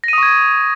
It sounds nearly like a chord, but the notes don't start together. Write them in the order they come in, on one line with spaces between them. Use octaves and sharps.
A#6 D#7 D#6 C#6 G#6